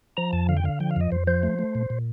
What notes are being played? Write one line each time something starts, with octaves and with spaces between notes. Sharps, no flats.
F3 A#5
F2 A5
D3 F5
G5
D3 F5
F3 G5
F5
F2 D#5
F2 C5
F3 C5
A3
A3
A#2
A#2